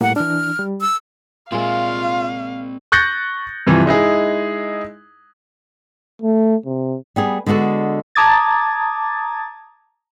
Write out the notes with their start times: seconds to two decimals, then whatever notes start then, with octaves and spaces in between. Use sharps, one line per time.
0.01 A2 G3 A#3 F#5
0.16 E3 D4 F6
0.59 G3
0.81 E6
1.52 A#2 G#3 C4 F4 D5 E5 F5
2.92 C#6 F#6 G6 A6 A#6 C#7
3.67 G2 C3 E3 F3
3.86 G#3 D#4 E4 G#4
6.22 A3
6.66 C3
7.16 G3 B3 G#4
7.46 D3 G#3 B3 F#4 A4
8.15 A5 A#5 D6 D#6 G#6 A6